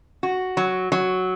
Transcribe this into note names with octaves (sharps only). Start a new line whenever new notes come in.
F#4
F#3
F#3